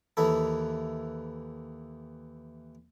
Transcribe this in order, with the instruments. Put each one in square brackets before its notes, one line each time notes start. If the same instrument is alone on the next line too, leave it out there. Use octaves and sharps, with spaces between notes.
[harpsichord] D#2 E3 E4 A4